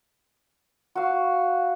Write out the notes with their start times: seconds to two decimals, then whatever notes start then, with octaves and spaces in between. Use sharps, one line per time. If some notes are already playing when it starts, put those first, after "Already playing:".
0.95 F#4 F5